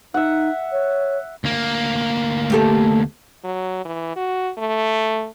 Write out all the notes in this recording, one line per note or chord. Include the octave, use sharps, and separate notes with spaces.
D#4 E5 F#5
C#5
D2 A#3
A3 G4 A4
F#3
E3
F#4
A3